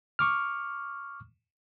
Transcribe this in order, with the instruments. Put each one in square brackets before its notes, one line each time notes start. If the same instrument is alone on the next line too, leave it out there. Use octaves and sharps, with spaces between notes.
[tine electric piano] C#6 D6 F6